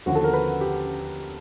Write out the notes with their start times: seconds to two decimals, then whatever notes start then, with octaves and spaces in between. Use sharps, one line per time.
0.06 D#2 D3 F3 F#4
0.15 A4
0.24 A#4
0.33 B4
0.61 G4